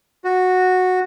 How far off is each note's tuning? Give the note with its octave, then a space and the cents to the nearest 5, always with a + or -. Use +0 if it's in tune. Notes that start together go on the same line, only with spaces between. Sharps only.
F#4 -10